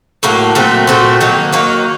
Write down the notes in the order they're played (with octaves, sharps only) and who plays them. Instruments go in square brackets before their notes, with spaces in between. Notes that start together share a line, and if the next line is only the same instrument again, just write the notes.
[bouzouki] A2 F#3 A#3
A#2 F#3 A3 C4
A#2 F#3 A3 C4
D#3 F#3 A#3 D#4
D#3 F#3 A#3 D#4